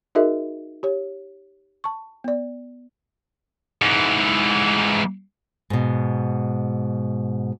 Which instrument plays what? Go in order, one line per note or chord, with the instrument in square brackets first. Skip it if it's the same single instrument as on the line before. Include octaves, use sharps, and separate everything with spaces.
[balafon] D#4 F#4 G#4 A#4 D#5 E5
G4 C#5
A5 C#6
B3 D5
[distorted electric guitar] G#2 E3
[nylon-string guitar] G#2 B2